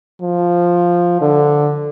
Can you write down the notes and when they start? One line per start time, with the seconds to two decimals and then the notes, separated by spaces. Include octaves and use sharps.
0.22 F3
1.21 D3